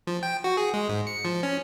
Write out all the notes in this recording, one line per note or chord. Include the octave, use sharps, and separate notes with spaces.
F3
G5
F#4
G#4
G#3
G#2
C#7
F3
C#4